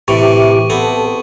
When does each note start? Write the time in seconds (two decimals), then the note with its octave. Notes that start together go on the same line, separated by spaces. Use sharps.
0.08 A2 C3 E3 G4 C#6 D6
0.70 B3 C4 A4